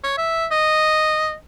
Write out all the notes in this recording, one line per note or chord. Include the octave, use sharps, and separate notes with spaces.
C#5
E5
D#5